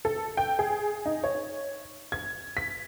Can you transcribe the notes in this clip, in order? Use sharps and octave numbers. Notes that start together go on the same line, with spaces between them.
A4
G5
G#4
D#4
C#5
G#6
B6